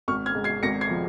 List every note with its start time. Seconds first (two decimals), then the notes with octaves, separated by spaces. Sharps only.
0.08 G#1 C#6 F6
0.26 F6 G#6
0.35 G#2
0.44 G#6 C7
0.63 G#1 A#6 C#7
0.81 G#6 C7
0.90 F3